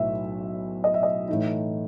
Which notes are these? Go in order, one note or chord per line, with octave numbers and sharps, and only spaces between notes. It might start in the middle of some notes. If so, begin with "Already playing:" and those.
Already playing: B1 A2 F#3 E5
D#5
E5
D#5
A2 E3 A3 D#4